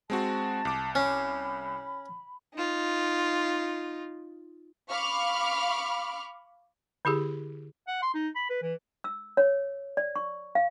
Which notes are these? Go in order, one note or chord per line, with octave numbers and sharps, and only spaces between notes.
G#3 C4 F#4 A5
C2 D6
C#4 B5
D#4 F4
F5 B5 C#6 D6 F6
D3 E4 G4 G#4
F#5
C6
D#4
B5
B4
E3
E6
C#5
D5
C#6
F5